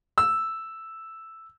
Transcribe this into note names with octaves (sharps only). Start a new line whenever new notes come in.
E6